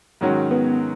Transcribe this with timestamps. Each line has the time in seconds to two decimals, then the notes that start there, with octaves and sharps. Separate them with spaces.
0.21 G#2 D#3 F#3 C#4 F#4
0.51 B3